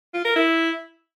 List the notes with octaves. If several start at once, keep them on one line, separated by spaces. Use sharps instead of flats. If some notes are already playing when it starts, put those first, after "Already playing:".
F4
A#4
E4